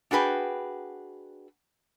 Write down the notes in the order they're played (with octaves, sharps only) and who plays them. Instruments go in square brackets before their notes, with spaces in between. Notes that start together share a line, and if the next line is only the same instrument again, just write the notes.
[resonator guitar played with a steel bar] D4 F#4 G#4 B4 G5